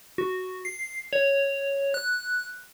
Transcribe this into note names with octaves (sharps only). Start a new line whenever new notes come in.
F#4
C7
C#5
F#6